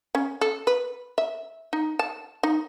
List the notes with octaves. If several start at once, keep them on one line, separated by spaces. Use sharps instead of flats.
C#4
A4
B4
E5
D#4
A5
D#4